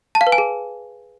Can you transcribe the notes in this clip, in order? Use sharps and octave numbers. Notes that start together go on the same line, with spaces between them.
A5
F5
B4
G#5
G#4